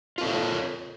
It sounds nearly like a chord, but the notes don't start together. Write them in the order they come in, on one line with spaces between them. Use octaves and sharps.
F4 A4 A#4 C#5